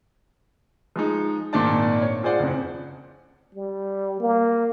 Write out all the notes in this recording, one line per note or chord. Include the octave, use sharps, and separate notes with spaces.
F3 G#3 D#4
G#1 A#2 D#3 D4 D5 A5
C#5
F4 G#4 C5 D5 F#5
F#1 F2
G3
A#3